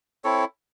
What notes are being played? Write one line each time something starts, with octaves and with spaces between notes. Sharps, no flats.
C4 E4 A4 C#5